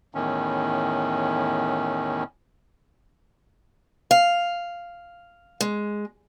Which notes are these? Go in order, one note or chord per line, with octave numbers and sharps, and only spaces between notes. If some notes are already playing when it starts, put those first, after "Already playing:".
E2 A2 D#3 C#4
F5
G#3